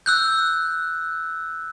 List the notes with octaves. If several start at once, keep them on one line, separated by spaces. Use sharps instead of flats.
E6 F#6 G6